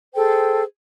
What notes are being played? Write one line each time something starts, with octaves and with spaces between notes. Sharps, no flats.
G#4 A4 C5 G5